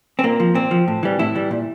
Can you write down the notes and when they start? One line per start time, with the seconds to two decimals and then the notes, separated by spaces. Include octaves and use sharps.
0.19 C4
0.23 A#2 A#3
0.40 F3
0.55 A#2 C4
0.71 F3
0.88 A2
1.03 E3 G3
1.19 A2 E4
1.35 E3 G3
1.51 A#2